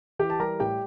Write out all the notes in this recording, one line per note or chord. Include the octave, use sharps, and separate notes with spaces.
E3 G4 G5
A5
G3 A#4 A#5
A2 G4 G5